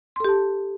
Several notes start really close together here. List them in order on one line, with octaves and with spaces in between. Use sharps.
C6 A4 G4 A5